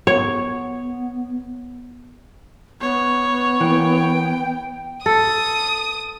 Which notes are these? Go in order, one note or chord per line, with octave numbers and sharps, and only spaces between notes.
B3 C#5
B3 C#5
E3 A#3 G5
A4 D#6